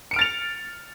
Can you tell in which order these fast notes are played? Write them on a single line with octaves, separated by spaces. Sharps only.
C#7 D7 F6 A6 F7